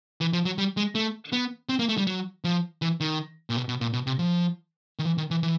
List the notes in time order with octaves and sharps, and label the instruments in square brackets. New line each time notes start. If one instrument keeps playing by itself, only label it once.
[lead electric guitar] E3
F3
F#3
G3
G#3
A3
B3
C4
A#3
A3
G3
F#3
F3
E3
D#3
A#2
B2
B2
A#2
B2
C3
F3
D#3
E3
D#3
E3
E3